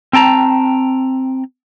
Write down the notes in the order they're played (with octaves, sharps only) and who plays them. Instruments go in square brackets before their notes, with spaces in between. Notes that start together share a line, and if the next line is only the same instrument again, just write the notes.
[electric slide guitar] C4 G5 A5 A#5